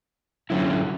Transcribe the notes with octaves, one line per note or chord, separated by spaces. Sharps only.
D3 F#3 C#4 E4